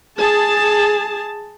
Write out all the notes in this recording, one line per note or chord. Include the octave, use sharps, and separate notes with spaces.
G#4 A5